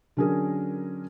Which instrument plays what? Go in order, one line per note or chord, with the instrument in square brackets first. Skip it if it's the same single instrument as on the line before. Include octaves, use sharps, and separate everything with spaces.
[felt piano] D3 F#3 C#4 D4 G#4 A#4